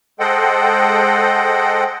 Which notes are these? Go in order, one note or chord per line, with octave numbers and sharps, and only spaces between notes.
G#3 A4 C5 D#5 F#5 G5